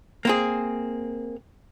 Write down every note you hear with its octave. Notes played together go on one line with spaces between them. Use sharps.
A#3 C4 G#4